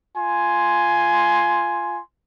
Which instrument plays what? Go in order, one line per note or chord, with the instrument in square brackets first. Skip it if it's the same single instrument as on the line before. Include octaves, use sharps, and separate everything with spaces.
[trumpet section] F4 G#5 C6